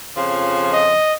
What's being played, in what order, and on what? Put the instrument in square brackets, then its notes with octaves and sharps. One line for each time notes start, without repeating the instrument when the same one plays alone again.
[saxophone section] F2 C#3 F3
[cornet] D#5